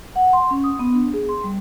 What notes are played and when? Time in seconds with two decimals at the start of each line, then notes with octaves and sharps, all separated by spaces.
0.16 F#5
0.33 C6
0.51 C#4
0.64 D#6
0.79 B3
0.94 D4
1.14 G#4
1.29 C6
1.44 G3